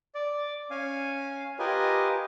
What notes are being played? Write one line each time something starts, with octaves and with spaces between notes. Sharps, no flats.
D5
C#4 F5 G#5
F4 G4 A#4 B4 D#5 G#5